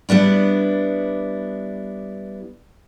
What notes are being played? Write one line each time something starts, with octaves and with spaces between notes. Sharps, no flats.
G3 B3 D4 E4